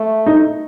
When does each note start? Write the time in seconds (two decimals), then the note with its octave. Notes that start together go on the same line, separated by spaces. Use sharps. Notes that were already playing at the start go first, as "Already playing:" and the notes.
Already playing: A3
0.26 D#4